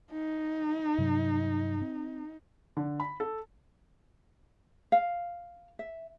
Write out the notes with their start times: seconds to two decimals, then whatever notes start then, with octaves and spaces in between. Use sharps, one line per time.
0.11 D#4
0.98 G2 C3 F#3
1.81 C4
2.77 D3
3.00 B5
3.20 A4
4.92 F5
5.79 E5